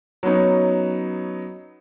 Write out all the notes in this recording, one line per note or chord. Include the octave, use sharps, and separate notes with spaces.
F#3 B3 C#4 D#4